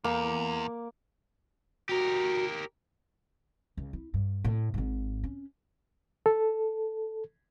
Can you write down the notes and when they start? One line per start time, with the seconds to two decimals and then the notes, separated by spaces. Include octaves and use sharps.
0.04 E2 A#3
1.89 F#4 G4 A#4
3.77 C#2
3.93 E4
4.14 G2
4.44 A2
4.74 G#1 G#2
5.24 C#4
6.26 A4